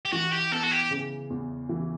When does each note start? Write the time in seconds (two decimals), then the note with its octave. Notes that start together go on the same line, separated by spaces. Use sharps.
0.05 G4
0.12 E3 F#4
0.32 G4
0.51 B3 A4
0.63 F#4
0.71 G4
0.91 C#3
1.30 E2
1.69 E3